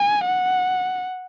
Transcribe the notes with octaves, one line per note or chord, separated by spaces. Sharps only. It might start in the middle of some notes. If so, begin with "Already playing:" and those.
Already playing: G#5
F#5